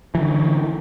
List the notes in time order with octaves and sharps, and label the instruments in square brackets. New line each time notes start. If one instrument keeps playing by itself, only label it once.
[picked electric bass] D3 E3